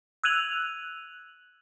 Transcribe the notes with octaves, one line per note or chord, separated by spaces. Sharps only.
E6 F#6 G#6 D#7 F7 F#7